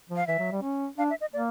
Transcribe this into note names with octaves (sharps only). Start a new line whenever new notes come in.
F3
F5
E3 E5
F#3
G3
C#4
D4 F5
E5
D#5
A#3 D5